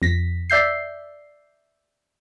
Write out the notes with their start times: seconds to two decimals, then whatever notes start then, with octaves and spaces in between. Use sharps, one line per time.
0.02 F2 A#6 B6
0.50 D5 E5 G6 C7